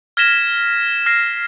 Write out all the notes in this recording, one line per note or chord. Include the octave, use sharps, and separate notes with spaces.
F6 G#6 A#6 B6 E7 G7
F6 A#6 C7